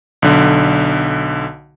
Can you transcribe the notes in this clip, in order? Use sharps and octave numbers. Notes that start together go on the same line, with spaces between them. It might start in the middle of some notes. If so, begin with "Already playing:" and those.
B1 D3